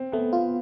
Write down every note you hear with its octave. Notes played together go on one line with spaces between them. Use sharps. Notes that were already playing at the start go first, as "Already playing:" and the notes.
Already playing: C4
A3 B3
F4